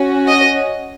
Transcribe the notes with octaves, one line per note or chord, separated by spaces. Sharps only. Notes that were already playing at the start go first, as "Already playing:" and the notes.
Already playing: C#4 F#4
D#5